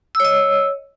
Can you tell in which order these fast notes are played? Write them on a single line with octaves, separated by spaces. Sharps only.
E6 C#5 D#5